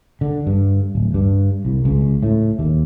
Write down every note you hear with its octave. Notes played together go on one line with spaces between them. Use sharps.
D3
G2
D1
G2
C2
C#2
A2
D#2